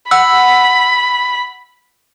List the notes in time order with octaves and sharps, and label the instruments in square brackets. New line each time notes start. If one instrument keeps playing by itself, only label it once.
[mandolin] F#5 [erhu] B5 [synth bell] E6